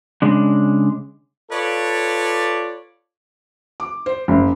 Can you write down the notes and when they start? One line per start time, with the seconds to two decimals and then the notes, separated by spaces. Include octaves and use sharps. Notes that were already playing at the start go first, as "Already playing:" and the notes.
0.22 C#3 G#3 D4
1.51 F4 A4 B4 C#5 D5
3.80 D6
4.06 C5
4.28 F#1